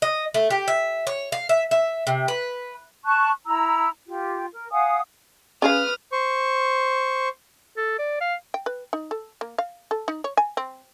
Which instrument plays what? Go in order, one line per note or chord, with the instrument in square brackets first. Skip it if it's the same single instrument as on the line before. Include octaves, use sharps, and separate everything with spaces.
[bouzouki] D#5
A3
G4
E5
C#5
F5
E5
E5
C3
B4
[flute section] A5 C#6 F#6
E4 A#5 E6
F4 G4
A#4
F5 F#5 G#5 D#6
[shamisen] C#4 G#4 F5 [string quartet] B4 D#6 F6
[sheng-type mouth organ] C5 C#6
[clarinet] A4
D5
F5
[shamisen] G5
B4
D#4
A4
A#3
F5
A4
D#4
C#5
G#5
C4